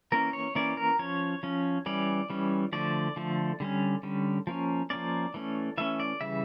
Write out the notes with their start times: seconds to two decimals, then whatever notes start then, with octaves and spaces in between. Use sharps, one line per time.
0.12 E3 A#3 C#4 A#4
0.33 C#5
0.55 E3 A#3 C#4 D5
0.77 A#4
0.99 F3 C#4 C#5
1.43 F3 C#4
1.86 E3 G3 C#4 D5
2.30 E3 G3 C#4
2.73 D3 F3 A3 D5
3.16 D3 F3 A3
3.60 D3 G3 C#4
4.03 D3 G3 C#4
4.47 F3 A#3 C#4
4.90 F3 A#3 C#4 D5
5.34 E3 A3 C#4
5.78 E3 A3 C#4 E5
6.00 D5
6.21 C#3 E3 G3 E5